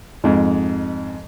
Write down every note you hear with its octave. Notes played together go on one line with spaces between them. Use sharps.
F2 G#2